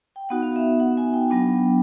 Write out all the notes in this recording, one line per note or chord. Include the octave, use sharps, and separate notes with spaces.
G5
B3 D#4 F#4 F#5
F5
E5
F#5
G#5
G5
F#3 B3 D4